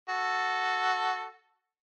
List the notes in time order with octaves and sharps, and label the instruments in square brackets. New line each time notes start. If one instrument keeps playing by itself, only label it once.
[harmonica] F#4 A4